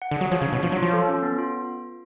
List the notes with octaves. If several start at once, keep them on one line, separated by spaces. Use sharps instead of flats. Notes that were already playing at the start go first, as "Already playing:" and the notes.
F#5
D3
F#3 G#4
F3 C#5
C#3
D4
B2
F3 C#5
F#3
F3 F4
A4
C#4
B3
F4